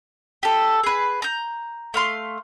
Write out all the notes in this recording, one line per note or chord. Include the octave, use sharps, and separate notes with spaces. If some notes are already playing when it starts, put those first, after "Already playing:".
G4 A4
G#4 B4
A#5 G6
A3 F5 C6